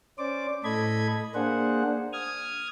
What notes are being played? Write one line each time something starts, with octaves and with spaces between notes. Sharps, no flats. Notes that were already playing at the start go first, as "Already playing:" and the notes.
C#4 C5 D5 D6
A2 A4 D#5 B5 G#6
A#3 D4 G#4 C5 F#5
D#6 F6 G#6